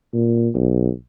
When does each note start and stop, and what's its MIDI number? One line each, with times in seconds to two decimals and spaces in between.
0.14 0.49 46
0.55 0.90 35